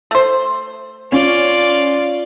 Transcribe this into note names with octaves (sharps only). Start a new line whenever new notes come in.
A3 C5
C#4 F4 D5